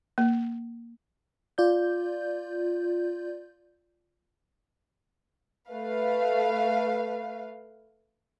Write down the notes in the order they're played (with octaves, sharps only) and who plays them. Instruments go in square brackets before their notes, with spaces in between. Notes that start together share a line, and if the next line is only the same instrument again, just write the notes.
[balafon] A#3
[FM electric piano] F4 D5 G6
[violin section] A3 B4 F5